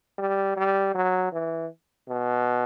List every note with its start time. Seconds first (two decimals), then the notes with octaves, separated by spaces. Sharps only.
0.18 G3
0.56 G3
0.95 F#3
1.32 E3
2.09 B2